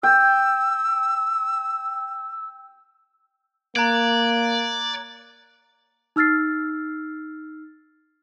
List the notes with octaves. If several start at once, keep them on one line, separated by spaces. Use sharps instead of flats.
G5 E6
A#3 D5 A#5 F#6 G#6
D#4 E6 F6 A6 C7